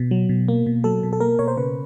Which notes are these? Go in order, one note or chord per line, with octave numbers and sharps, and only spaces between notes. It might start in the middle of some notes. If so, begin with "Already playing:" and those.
Already playing: B2
F#3
B2
A#3
B2
F#3 A4
B2
A4
A#3 A#4
B2 C#5
C5
C#3 B4